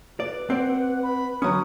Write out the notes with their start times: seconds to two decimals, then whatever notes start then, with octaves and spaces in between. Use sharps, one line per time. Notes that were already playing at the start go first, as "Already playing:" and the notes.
0.20 B4 D5
0.50 C4 D5 F#5
1.03 B5
1.42 D3 F#3 C#4 D#6